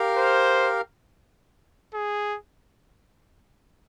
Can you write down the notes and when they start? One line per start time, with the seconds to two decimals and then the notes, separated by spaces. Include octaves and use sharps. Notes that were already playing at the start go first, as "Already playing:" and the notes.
Already playing: G4 A#4 F5
0.17 C5
1.94 G#4